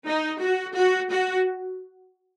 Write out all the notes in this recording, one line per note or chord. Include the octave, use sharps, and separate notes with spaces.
D#4
F#4
F#4
F#4